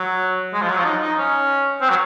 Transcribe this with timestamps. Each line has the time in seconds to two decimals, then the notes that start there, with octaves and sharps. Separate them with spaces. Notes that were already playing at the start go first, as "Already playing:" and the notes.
Already playing: F#3
0.54 G#3
0.61 F3
0.69 F#3
0.77 F3
0.85 D#4
1.01 D#4
1.18 C#4
1.81 C4
1.90 F#3